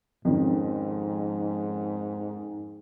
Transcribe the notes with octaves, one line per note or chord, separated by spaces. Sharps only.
F2 G#2 D#3 C#4